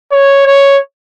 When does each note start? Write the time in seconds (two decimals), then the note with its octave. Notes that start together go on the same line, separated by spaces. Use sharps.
0.12 C#5
0.46 C#5